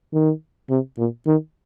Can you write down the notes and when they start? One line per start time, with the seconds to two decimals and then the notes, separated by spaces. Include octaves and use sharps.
0.13 D#3
0.70 C3
0.98 A#2
1.27 D#3